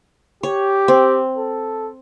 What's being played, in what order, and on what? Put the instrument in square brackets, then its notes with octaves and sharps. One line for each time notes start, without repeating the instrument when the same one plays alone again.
[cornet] G4 [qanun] C#5
[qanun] C4
[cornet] A4